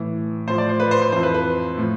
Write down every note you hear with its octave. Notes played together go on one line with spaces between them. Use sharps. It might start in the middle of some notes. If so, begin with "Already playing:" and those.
Already playing: A2 E3
A2 F3 C5
D5
C5
B4
C5
C5
F2 E3 C5
B4
B4
A2 F3